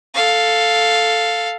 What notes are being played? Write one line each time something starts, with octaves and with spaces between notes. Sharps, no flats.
A4 F5